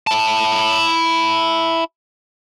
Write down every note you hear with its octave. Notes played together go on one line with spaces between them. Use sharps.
E4 A5